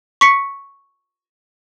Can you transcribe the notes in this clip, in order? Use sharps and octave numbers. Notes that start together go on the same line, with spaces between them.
C#6 B6 C#7